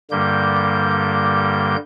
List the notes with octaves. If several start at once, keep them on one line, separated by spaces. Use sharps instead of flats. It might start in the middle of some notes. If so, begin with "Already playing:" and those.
G2 D3 G3 A#3 G6